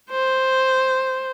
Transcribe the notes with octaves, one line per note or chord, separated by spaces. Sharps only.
C5